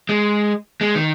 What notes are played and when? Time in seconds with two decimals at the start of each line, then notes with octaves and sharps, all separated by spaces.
0.09 G#3
0.81 G#3
0.95 D#3